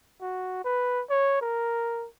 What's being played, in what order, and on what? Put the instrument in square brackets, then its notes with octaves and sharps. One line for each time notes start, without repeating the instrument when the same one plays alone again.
[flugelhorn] F#4
B4
C#5
A#4